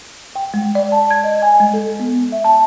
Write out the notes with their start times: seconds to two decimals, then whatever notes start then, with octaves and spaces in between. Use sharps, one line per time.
0.36 G5
0.54 G#3
0.75 D5
0.92 A5
1.11 G#6
1.24 D#5
1.42 G#5
1.60 G#3
1.74 A4
2.00 B3
2.32 E5
2.44 A5